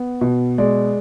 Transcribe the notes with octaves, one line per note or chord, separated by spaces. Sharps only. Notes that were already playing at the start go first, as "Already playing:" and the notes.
Already playing: B3
B2
G#3 D5